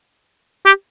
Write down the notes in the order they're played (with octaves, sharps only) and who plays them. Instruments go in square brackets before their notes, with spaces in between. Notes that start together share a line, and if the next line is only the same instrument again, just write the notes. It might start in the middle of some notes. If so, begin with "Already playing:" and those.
[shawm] G4